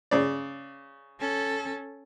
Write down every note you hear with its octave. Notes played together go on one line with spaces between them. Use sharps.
C#3 D5
C#4 A4